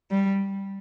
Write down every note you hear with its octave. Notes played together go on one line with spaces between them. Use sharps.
G3